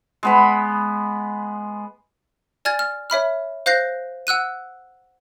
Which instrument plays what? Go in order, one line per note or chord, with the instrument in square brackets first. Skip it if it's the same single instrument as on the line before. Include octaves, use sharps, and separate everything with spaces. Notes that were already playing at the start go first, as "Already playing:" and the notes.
[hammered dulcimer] G#3 B3 B5
[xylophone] D5 G#5 F6 G#6 A6
F6
C#5 E5 B5 F6
C5 F5 F#6 G6 A#6 C7
F#5 E6 F#6 D#7